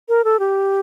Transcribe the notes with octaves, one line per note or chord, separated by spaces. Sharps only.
A#4
A4
G4